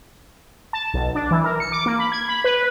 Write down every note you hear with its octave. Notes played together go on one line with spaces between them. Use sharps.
A5
B1
D4
E3
A#4
C#7
D6
A#3
B5
G#6
B5
B4